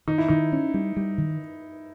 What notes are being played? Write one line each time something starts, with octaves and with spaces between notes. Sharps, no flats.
D#3 D#4
E4
D#3 D#4
C#4
G3
G3
D#3